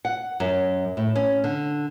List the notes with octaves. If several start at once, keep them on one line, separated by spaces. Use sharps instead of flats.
F#5
F#2
A2
C#4
D3